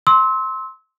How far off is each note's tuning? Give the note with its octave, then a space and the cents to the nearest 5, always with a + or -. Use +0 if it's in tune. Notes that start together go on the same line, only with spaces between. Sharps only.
C6 +5 E6 -30